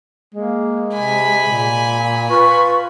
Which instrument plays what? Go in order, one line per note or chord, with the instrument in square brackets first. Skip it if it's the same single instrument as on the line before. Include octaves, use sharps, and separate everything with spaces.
[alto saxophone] G#3 [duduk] A#3
[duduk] C3 [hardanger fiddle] G#5 B5
[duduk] A#2
[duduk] F4 [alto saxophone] B4 [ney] C#6